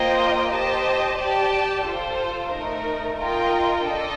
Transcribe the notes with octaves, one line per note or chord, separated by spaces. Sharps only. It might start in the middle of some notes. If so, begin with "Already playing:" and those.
Already playing: A#3 F4 C5 D#5 G5
G4 C5 D#5 A5
G4 D5 A5
F4 A4 C5
A3 D#4 A#4
F4 A#4 D#5 G5
D4 A4 D#5